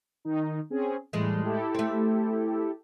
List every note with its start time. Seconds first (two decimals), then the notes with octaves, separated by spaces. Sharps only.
0.25 D#3 D#4
0.70 C4 C#4 G#4
1.13 A2 E3 G3 G#3
1.43 E4 G4 A4
1.75 A3 C4